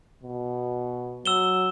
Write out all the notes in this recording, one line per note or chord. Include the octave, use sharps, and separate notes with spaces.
B2
F#3 E6 E7 G7